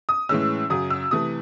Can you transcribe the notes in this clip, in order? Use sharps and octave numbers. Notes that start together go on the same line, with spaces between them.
D#6
A2 E3 G#3 C#4 E6
F#2 C#3 F#3 D#6
E6
C3 E3 A3 D#6